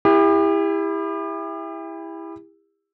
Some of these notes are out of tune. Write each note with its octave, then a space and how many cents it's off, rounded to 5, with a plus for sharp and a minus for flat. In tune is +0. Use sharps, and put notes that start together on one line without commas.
E4 +0 G4 +40